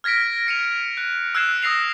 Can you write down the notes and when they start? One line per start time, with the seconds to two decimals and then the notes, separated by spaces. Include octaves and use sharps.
0.04 F6 G#6 A#6 B6 D7
0.47 A#6 C#7 D#7 F7
0.97 F#6
1.35 E6 F#6 G#6 C7 E7
1.63 D#6 E6 A#6 C7 F7